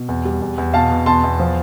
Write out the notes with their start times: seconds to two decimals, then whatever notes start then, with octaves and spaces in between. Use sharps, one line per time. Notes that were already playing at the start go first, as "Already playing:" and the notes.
Already playing: B2
0.09 E2
0.25 G3
0.42 E2
0.58 E2
0.74 B2 F5 A5
0.91 B2
1.06 E2 A5 C6
1.24 E2
1.39 F3